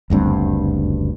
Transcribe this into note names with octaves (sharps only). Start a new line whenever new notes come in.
F#1 D2 G2 C4